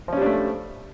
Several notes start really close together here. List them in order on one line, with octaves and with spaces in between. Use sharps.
F3 C#4 G3 D4 A3